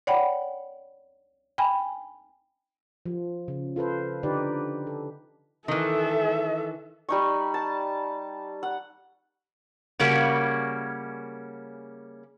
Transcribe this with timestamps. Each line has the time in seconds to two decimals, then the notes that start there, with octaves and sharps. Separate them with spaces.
0.07 C#5 D5 F#5 G5 B5
1.58 G5 G#5 B5
3.06 F3
3.48 C#3
3.76 F4 A4 B4 C5
4.23 D3 D#4 G4 B4 D5
4.87 A4
5.68 D#3 E3 A4 E5
7.09 G3 D#4 C#6
7.54 A5
8.63 F#5
9.99 C#3 G3 A#3 C#4 F#4